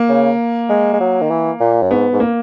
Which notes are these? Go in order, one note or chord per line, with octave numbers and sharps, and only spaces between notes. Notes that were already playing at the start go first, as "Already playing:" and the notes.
Already playing: A#3
C#3
G#3
G#3
F#3
D#3
E3
A#2
F#2
G#2 B3
G#2
A#3